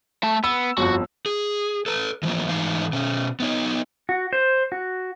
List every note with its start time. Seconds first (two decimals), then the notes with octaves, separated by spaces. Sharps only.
0.23 A3 A5
0.44 B3 E6
0.78 G1 F2 F#4
1.26 G#4
1.86 A4 B4
2.23 E3 F3 A#3
2.47 G#2 E3 D#4 F5
2.93 B2 C#4
3.40 B3 D#4 C#5
4.09 F#4
4.33 C5
4.72 F#4